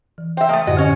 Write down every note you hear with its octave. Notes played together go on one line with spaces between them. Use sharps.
E3
C5 E5 G5
A3 A#3 A5 D#6
F#2 A2 D3 G#3 F#4 D#5
C#4